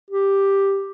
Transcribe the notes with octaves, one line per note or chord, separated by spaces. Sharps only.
G4